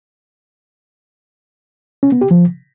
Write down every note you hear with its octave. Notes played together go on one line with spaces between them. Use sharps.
C#4
B3
G4
F3